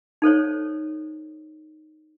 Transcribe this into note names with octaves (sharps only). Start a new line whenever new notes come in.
D#4 A4 C5 C#5